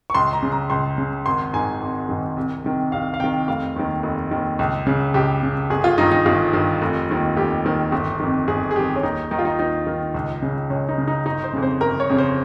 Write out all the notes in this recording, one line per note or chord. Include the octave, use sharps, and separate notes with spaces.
C#6
C#2 C6
A#5
C#3
A#5
C#2 C6
C#3
G#1 C6
G#2 D#3 G#5
G#1
G#2 D#3
C2
C3 D#3
C2 F5
F5
C3 D#3 G5
F1 F5
D#2 D#3
F1
D#2 D#3
C#2
C#3
C#2 G4
C#3
G1 G#4
F4
G2 D#3 D#4
D#4
G1 F4
G2 D#3
F1
D#2 D#3
F1 G4
D#2 D#3
G1
F2 D#3
G1 G#4
G#4
F2 D#3 G4
C#4
D#2 D#4
D#3 D#4
F4
D#4
D#2 D#4
D#3
C#2
C#3
C#2 C#4
D#4
C#3
D#4
G1 D#4
C5
F2 C#3
C5
G1 A#4
C#5
F2 C#3
C5